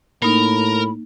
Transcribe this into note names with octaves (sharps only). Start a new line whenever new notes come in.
A2 A#3 D#4 A#4 B5